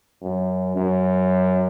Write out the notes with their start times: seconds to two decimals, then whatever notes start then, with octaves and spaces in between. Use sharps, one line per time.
0.23 F#2
0.76 F#2